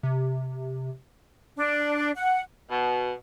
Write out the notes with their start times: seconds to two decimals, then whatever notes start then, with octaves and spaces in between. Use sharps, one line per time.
0.03 C3
1.57 D4
2.16 F#5
2.70 B2